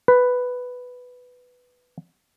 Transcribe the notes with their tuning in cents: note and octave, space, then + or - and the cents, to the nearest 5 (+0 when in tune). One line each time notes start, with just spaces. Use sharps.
B4 +5